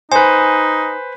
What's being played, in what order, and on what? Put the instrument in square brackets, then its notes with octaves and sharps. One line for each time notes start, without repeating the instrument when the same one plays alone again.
[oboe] D#4 [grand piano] B4 C5 [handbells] G#5